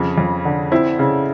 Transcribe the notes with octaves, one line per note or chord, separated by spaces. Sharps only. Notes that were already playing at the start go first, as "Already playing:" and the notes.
Already playing: F2 C#3
F2
D3
C4 E4
C#3